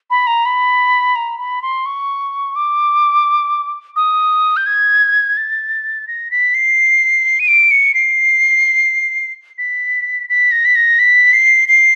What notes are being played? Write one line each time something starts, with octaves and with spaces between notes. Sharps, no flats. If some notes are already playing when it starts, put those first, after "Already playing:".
B5
A#5
B5
A#5
B5
C6
C#6
D6
D#6
G6
G#6
A6
A#6
B6
C7
D#7
D7
C#7
C7
B6
B6
A#6
B6
A#6
B6
C7
C7